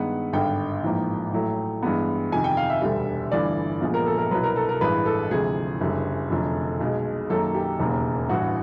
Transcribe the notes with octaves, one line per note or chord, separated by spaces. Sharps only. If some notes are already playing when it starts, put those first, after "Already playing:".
Already playing: G2 D#3 G#3 B3 F#5
G#1 G2 D3 G5
A1 G#2 F3 A#3
A1 A2 F#3 A3
G2 E3 G#3 B3
F2 C3 D#3 G#5
G5
F5
E5
E1 D2 D3 G3
G1 G2 E3 A3 D5
A#1 A#2 F3 G#3 B3
A#4
A4
A#4
C2 B2 F#3 B4
A#4
A4
A#4
A1 G2 E3 G#3 B4
A4
D2 C3 F3 G#3 G#4
F#1 F#2 D3 G3
F1 F2 D3 F#3 A3
B1 B2 G#3
F#2 D#3 F#3 A#3 A4
G4
E1 D#2 C#3 F#3 A#3
A1 G2 E3 F#4